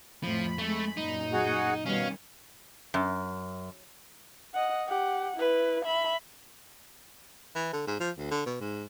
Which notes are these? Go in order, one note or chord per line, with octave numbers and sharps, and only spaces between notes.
F2 A2 F3 B5
G#3 A3
F#2 A#2 D#4
F#4 G#4 F#5
B2 D#3 G3 C#4 F5 F6
F#2
D#5 F#5
G4 F#5
E4 B4
E5 B5
E3
D3
G#2
F3
D2
D3
B2
G#2